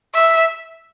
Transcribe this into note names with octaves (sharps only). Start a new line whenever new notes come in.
E5